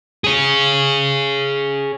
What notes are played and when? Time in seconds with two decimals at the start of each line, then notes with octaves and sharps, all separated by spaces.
0.24 G#4 C#5